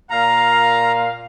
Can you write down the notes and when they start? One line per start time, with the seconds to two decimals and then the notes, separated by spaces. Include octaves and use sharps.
0.10 A#2 F5 A#5